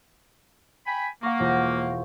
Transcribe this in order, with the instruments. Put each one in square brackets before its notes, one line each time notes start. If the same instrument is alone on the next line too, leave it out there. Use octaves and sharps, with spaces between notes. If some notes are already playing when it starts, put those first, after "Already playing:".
[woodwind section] G5 G#5 B5
[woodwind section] A#3 [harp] F#5 C#6
[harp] E1 F4 G6